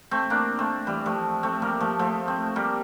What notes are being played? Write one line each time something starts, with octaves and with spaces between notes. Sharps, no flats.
A3 C4
A#3 D4
A3 C4
E3 G3
F3 A3
A3 C4
G3 A#3
F3 A3
F3 A3
A3 C4
G3 A#3